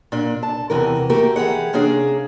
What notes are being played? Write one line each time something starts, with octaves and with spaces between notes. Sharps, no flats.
A#2 D4
A5
E2 C3 E3 A#4
A3 A#3 F#4 G4 A#4
E3 G4 G#4 F#5
C3 A#3 C#4 D4 G#4